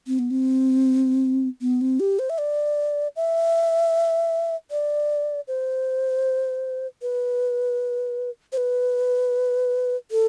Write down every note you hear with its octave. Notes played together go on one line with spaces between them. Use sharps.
C4
B3
C4
B3
C4
G4
C5
E5
D5
E5
D5
C5
B4
C5
B4
A4